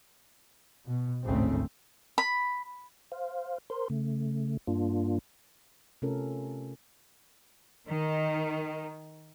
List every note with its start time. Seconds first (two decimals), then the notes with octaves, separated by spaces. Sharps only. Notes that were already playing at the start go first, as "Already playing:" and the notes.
0.85 B2
1.24 G#1 D2 A2 C#3 A3 C4
2.18 B5
3.12 C5 F5
3.70 A#4 C5 C6
3.90 C#3 A3
4.67 G2 A#3 D4 F4
6.02 C3 A3 C#4 F4 A4 A#4
7.89 D#3